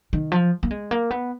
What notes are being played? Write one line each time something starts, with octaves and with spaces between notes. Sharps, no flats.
D#3
F3
A#3
G#3
A#3
B3